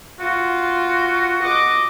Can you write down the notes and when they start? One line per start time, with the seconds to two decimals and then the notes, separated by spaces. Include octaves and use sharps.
0.20 F4 F#4
1.42 D#5 D6